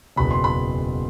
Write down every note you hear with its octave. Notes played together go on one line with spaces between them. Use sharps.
F#1 E2 B2 B5
C6
B5